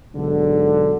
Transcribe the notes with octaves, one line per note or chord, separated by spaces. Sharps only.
B1 G#2 D3